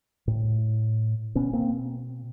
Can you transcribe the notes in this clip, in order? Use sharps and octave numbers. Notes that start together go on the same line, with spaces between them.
A2
B2 B3 C#4
A#3 C4